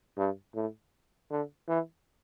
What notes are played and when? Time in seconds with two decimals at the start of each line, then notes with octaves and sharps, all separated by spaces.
0.17 G2
0.55 A2
1.31 D3
1.68 E3